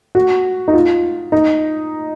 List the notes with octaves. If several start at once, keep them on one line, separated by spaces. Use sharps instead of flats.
F#4
D#4
F4
D#4